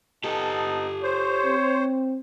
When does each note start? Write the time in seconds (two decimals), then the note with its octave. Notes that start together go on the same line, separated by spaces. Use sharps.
0.24 B3 D#4 G4 A4 A5
1.03 C5 C#5
1.45 C4